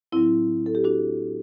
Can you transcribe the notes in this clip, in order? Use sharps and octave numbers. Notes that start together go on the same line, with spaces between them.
A2 F#3 C4 E4
A4
G4
D4 F#4